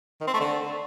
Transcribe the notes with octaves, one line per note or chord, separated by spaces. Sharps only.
D#3
C4
A3
D3